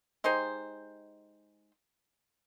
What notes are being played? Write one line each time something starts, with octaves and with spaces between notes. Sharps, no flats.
G#3 D#4 G4 C5